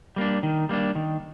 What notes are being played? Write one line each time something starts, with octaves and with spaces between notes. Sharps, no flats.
G3 A#3 D4
D#3
G3 A#3 D4
D#3